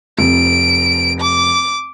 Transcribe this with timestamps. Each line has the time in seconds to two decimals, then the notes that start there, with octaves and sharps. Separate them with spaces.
0.19 F1 F2 D7
1.21 D6